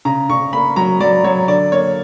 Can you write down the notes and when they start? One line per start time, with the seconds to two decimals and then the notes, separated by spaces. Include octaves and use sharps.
0.05 C#3 A#5
0.30 C#3 C#6
0.53 A#3 B5
0.76 F#3 A#5
1.00 F#3 D5
1.24 F#3 C#5
1.48 D3 D5
1.72 A#3 C#5